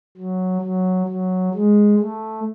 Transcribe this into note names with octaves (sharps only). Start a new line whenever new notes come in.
F#3
F#3
F#3
G#3
A3